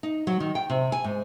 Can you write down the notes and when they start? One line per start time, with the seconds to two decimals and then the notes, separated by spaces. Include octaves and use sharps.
0.03 D#4
0.27 F#3
0.40 D#3
0.55 G5
0.70 C3
0.92 G#5
1.04 G#2